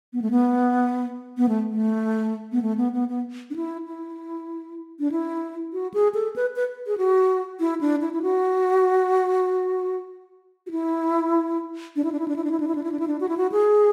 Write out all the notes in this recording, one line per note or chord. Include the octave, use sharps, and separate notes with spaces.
B3
A3
B3
B3
A3
A3
B3
A3
B3
B3
B3
D4
E4
E4
D4
E4
F#4
G#4
A4
B4
B4
G#4
F#4
E4
D4
E4
E4
F#4
F#4
E4
D4
E4
D4
E4
D4
E4
D4
E4
D4
E4
D4
E4
D4
E4
D4
F#4
E4
F#4
G#4